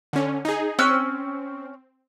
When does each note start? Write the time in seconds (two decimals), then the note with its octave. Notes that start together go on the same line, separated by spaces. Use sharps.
0.13 D3 C#4
0.45 D#4 G#4
0.79 C4 C#4 E6 F#6